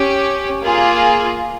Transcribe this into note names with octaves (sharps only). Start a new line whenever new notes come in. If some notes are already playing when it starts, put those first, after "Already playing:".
Already playing: C#4 G4
A#3 F4 G#4